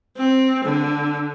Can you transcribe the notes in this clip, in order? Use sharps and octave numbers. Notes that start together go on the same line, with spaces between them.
C4
D3